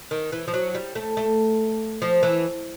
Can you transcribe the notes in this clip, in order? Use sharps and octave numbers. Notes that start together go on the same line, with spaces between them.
D#3
E3
F3
F#3
G3
A3
A3
F3
E3